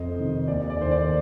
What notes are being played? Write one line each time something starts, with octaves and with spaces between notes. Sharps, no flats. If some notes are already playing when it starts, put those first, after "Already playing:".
Already playing: F2 C5 D#5
C3 D#3
D#2 D5
D5
D#3 C5
D5